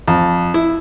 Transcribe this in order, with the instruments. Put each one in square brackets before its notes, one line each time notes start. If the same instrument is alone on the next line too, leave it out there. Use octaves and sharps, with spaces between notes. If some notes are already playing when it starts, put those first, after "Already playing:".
[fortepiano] F2
E4